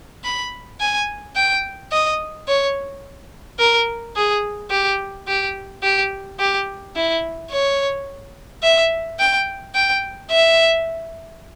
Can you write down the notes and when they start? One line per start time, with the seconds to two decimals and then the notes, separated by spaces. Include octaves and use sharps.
0.24 B5
0.80 G#5
1.36 G5
1.92 D#5
2.48 C#5
3.59 A#4
4.16 G#4
4.71 G4
5.27 G4
5.83 G4
6.39 G4
6.96 E4
7.51 C#5
8.63 E5
9.19 G5
9.75 G5
10.31 E5